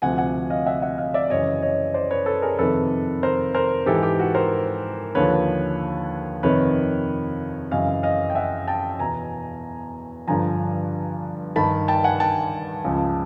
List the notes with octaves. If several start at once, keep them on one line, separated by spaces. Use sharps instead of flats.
D2 C3 F3 F#5 G#5
F#5 G#5
D#5 F5
E5 F#5
E5 F#5
D#5 F5
D5 E5
F#2 C#3 E3 C#5 D#5
C#5 D#5
C5 D5
B4 C#5
A4 B4
G#4 A#4
F2 C3 D#3 A4 B4
A#4 C5
A#4 C5
G#2 E3 G4 A4
G4
F#4
A#4 C5
D#2 D3 F3 B4 C#5
F2 C3 D#3 B4 C#5
F#2 C#3 E3 D#5 F5
D#5 F5
G5
E5 F#5
G5 A5
E2 B2 G#5 A#5
G2 D3 F3 G#5 A#5
G2 D#3 A5 B5
G5 A5
F#5 G#5
G5 A5
C#2 C#3 F3